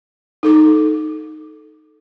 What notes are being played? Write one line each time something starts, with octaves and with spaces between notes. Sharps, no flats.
D#4 A4 D6